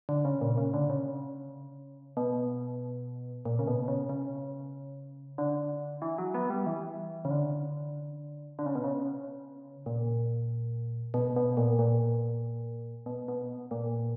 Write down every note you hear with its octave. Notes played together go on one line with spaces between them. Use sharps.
D3
C#3
A#2
C#3
D3
C#3
B2
A#2
C#3
B2
C#3
C#3
D3
E3
F#3
B3
G3
E3
C#3
D3
D3
C#3
B2
C#3
A#2
B2
B2
A#2
A#2
B2
B2
A#2